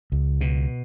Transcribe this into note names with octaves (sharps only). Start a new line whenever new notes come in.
C#2
B2